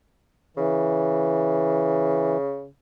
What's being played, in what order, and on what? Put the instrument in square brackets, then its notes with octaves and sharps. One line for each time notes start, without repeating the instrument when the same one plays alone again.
[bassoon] C#3 [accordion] E3